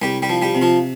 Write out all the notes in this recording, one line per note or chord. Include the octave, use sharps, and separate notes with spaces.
C2 G3 G4
G3 G4
F3
G3 G4
C3
F3 F4